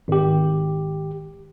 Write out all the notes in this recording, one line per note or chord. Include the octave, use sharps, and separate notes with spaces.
G#1 G4